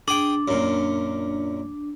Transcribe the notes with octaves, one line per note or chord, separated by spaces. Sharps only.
D4 G#4 G5
F#2 A#2